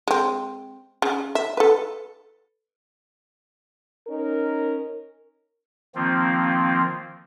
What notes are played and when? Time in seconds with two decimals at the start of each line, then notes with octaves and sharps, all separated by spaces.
0.08 G#3 C4
1.02 C#3
1.35 E5
1.57 A4 B4
4.07 C#4 D#4 A#4
5.95 D#3 F3 A#3 C4 F4